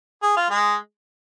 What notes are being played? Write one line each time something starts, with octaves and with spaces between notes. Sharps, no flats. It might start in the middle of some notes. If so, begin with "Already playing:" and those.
G#4
F4
G#3 G#4